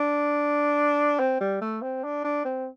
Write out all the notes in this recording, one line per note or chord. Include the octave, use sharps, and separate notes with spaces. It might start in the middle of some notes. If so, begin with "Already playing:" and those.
Already playing: D4
C4
G3
A3
C4
D4
D4
C4